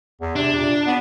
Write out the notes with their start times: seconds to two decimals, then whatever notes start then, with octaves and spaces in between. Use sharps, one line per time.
0.21 E2
0.36 C3 D4
0.54 A#2
0.87 B3